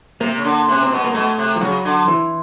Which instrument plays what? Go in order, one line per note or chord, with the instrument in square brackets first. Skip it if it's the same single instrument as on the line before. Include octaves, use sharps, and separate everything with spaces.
[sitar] C3 [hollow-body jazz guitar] A#3
[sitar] C#3
D3
[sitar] C3 [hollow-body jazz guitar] C#4
[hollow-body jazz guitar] C4
[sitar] B2 [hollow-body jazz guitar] B3
[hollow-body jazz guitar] A#3
[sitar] B2 [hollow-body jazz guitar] A3
[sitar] C3
[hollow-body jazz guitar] F3
[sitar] C#3 [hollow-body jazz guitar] F#3
[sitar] D3
[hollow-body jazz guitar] E3